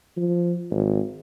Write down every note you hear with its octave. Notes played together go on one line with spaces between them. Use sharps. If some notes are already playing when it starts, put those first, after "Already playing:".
F3
G#1